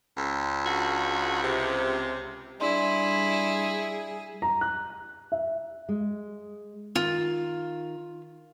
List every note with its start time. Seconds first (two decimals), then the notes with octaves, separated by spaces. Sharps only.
0.17 C#2
0.65 D4 F4 F#4
1.41 C3
2.61 G3 D4 E4 G#4 D5 C6
4.42 A#5
4.61 F#6
5.32 E5
5.89 G#3
6.96 D#3 F4